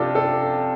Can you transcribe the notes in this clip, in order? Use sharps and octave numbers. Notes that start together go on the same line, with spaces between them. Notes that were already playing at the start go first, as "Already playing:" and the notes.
Already playing: C3 F3 D4 F4 G4 A4
A4